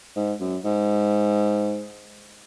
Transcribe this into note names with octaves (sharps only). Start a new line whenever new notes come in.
G#2
F#2
G#2